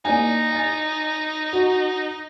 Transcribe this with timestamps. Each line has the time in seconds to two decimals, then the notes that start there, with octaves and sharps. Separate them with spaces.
0.05 A#3 D#4 D5 G#5
0.52 G#5 A6
1.53 F#4